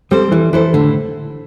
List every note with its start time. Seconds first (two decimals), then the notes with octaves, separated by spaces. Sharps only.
0.11 G3 C4 A4 C5
0.32 E3 G3
0.53 E3 E4 A4 C5
0.74 A2 D3